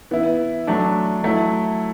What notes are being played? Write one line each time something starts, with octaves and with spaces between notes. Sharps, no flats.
E3 B3 E4
F#3 A3 D4
F#3 A3 E4